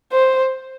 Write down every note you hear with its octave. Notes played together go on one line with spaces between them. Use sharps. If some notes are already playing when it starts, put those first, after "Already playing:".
C5